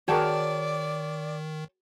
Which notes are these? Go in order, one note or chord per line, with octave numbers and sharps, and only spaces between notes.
D#3 F#4 G#4 A#4 C#5 D5 G5 A5